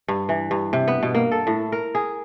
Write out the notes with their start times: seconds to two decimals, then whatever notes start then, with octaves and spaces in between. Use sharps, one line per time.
0.08 G2
0.29 E3
0.51 G2
0.73 C3
0.88 B3
1.03 B2
1.15 A#3
1.32 A4
1.47 A2
1.72 A#4
1.95 G#4